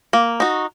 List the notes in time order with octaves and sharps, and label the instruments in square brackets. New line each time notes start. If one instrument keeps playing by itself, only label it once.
[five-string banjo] A#3
D#4 F#4